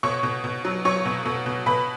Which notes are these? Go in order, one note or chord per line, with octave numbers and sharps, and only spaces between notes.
B2 C#5 C#6
B2
B2
F#3
F#3 C#5 C#6
B2
B2
B2
B2 B4 B5